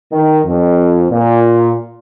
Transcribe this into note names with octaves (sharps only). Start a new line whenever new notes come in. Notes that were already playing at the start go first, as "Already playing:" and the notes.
D#3
F2
A#2